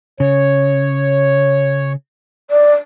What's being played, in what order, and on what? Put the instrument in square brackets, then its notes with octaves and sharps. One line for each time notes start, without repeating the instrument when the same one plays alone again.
[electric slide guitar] C#3 [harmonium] C#5
[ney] D5